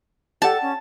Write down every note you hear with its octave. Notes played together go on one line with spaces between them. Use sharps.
G4 A4 D5 F#5 A5
C#4